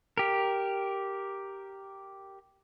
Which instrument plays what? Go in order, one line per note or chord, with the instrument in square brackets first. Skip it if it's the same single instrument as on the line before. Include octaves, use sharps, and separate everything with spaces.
[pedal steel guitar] G4 A#4